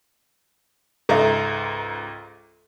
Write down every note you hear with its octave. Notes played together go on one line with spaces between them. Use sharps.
C#2 G#2 A4 E5 A#5